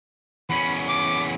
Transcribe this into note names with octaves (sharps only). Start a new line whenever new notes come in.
E2 C#4 B5
D6